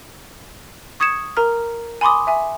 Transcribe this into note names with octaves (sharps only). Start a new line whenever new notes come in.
C#6 D#6 G#6 C#7 E7
A#4 A#5 F6
G#5 B5 C6 D6 D#6
E5 G#5